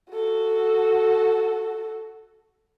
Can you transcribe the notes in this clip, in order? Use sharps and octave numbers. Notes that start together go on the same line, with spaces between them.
F#4 A4